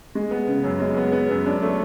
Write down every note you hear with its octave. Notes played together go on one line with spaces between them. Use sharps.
G#3
B3
C#3
F#2
G#3
B3
B3
F#2
D4
A3